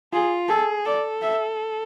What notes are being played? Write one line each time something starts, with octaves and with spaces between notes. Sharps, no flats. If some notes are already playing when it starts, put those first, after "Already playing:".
F4 G#4
G#4 A4
A4 D5
E5